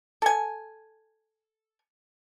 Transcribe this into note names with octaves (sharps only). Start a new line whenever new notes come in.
A4 G#5